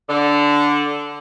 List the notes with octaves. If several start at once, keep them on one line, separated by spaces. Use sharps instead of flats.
D3